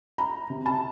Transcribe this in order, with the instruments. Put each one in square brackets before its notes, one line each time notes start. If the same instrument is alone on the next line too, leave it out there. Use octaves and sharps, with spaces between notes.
[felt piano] A#5
C3
A5